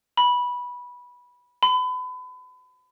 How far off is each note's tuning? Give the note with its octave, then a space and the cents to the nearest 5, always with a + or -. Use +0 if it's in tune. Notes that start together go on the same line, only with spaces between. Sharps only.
B5 -15
B5 +35